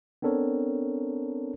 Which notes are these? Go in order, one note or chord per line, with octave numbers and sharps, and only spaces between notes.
B3 C4 D4 A4 A#4 C#5